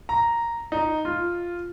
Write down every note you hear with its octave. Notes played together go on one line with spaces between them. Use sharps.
A#5
D#4
F4